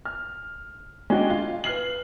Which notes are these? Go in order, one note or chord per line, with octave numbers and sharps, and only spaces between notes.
F6
G#3 C#4 D4 F#4 G4
F4
B4 F6 C7 F#7